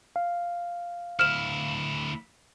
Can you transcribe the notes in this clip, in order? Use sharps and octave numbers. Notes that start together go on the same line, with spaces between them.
F5
D2 E4 F6 E7